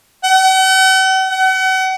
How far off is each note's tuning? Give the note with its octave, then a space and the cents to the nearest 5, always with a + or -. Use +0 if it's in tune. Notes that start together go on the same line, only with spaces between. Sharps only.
F#5 +45
F#5 +35